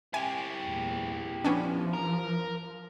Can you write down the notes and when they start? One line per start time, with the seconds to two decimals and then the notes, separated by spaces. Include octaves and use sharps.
0.14 E4 G4 G#5
0.64 E2 A#2
1.44 F3 B3 C#4 D4
1.93 A#4